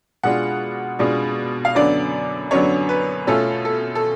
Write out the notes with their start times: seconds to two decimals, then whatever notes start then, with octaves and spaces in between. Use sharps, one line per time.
0.23 B2 G#3 D4 F4 F#5
0.99 B2 G#3 D4 F4
1.65 F5
1.75 F#2 D3 F#3 B3 D4 D5
2.51 F#2 D3 F#3 B3 D4 C#5
2.89 B4
3.27 B2 A3 C#4 F4 A4
3.65 A4
3.95 A4